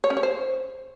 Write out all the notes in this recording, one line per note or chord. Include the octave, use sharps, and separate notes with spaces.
C#5
C#4
C#5
C5